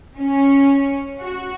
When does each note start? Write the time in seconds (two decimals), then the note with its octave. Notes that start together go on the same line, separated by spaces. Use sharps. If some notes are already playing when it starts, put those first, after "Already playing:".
0.17 C#4
1.21 F#4